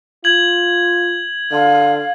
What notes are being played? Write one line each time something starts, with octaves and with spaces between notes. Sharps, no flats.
F4 G#6 F#7
D3 F5